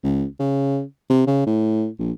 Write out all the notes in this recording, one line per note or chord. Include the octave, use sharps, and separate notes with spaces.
C#2
C#3
C3
C#3
A2
A#1